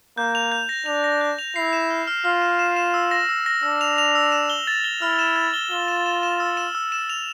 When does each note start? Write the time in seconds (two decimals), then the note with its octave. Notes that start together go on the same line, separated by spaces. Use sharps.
0.18 A#3 G6
0.35 F7
0.52 G6
0.69 A#6
0.86 D4 F7
1.04 A#6
1.21 G6
1.39 F7
1.56 E4 C7
1.73 E7
1.90 F6
2.07 F6
2.25 F4 F6
2.42 E7
2.59 E7
2.76 E7
2.94 E6
3.11 A#6
3.29 E6
3.46 A#6
3.63 D4 E6
3.81 F7
3.98 F7
4.15 E6
4.32 E7
4.50 G7
4.67 A6
4.84 G7
5.02 E4 F6
5.19 E7
5.36 A6
5.54 G7
5.71 F4 G7
5.88 E7
6.06 E7
6.23 E7
6.40 E6
6.57 E7
6.75 E6
6.92 E7
7.10 F7